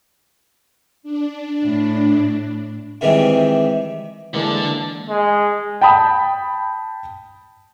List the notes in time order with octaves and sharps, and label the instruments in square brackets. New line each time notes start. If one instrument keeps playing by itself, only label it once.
[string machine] D4
[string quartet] A2
[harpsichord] C3 D#3 E3 G3 G#3
[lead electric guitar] D3 D4 [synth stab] E3 G#3 A#3
[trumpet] G#3
[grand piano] G5 A5 B5 D#6